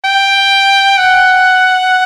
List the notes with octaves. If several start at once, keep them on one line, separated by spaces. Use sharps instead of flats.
G5
F#5